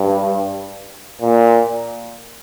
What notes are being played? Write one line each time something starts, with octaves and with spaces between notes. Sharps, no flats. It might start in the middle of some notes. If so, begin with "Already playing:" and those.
Already playing: G2
A#2